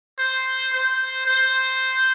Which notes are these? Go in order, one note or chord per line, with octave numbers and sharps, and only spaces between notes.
C5
C5
C5